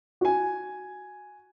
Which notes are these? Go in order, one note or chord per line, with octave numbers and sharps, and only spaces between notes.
F#4 G#5